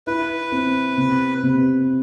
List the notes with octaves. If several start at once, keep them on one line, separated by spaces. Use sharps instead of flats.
E4 B4
C4
C3
C3